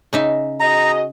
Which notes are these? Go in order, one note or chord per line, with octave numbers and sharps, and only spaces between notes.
C#3 D#4 E5
F#4 G#4 D#5 A#5